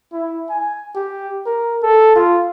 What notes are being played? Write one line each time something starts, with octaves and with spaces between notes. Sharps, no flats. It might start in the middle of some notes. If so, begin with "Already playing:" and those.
E4
G#5
G4
A#4
A4
F4